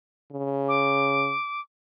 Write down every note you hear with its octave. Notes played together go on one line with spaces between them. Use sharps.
C#3
D6